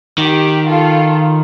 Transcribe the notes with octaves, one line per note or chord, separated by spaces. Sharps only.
D#3 G4
F4 A4